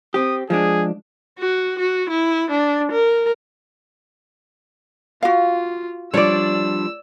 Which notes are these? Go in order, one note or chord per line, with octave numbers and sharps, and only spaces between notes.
C4 G4 D#6
F3 G#3 D4 G#4
F#4
F#4
E4
D4
A#4
F4 F#4 F5
F3 G3 D4 C#5 D5 E6